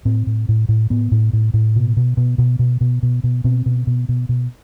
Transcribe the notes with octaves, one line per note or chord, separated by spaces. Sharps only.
A2 C4
A2
A2
A2
A2 B3
A2
A2
A2
B2
B2
B2
B2
B2
B2
B2
B2
B2 C4
B2
B2
B2
B2